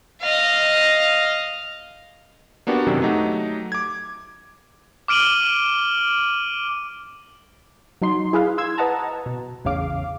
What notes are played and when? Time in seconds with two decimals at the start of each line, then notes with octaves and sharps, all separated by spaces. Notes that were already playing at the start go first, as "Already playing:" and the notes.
0.21 D#5 F5
2.67 A#3 B3 D4 F#4 G4
2.87 F#2 C3 D#3 F#3
3.02 F#3 A3 D#4 F#4 G4
3.72 D6 G#6
5.08 D6 F6 D7 D#7 F#7 G7
8.02 F#3 D#4 C6
8.33 E4 G#4 B4 F5
8.58 C6 E6 G#6
8.78 B4 D#5 F#5 A5 A#5
9.26 B2
9.65 A1 E2 C#3 F5 D6